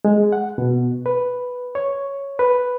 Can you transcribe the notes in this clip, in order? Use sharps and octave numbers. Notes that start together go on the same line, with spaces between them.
G#3
F#5
B2
B4
C#5
B4